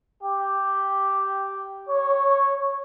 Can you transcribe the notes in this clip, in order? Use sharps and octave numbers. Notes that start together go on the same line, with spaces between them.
G4
C#5